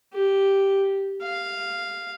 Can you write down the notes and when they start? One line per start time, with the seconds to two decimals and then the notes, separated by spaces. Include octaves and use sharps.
0.14 G4
1.23 F5